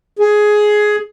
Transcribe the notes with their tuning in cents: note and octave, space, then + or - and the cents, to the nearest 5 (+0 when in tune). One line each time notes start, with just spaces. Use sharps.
G#4 +15